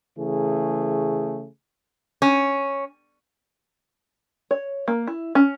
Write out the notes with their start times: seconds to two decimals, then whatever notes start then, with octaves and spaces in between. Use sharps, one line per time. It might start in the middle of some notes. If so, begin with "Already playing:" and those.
0.18 C#3 E3 A3 G#4
2.22 C#4
4.51 C#5
4.88 A#3
5.07 E4
5.35 C#4